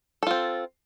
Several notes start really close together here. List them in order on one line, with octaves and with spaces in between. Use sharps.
A4 F4 C4